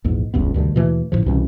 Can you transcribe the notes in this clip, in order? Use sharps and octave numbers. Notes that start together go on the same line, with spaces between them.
A#1 E2 G#2
E1 C#2 G2 B3
D2 G2 C3 D#3
D#2 B2 E3 A3
A1 A2 C3 F3
C2 B2 E3 C#4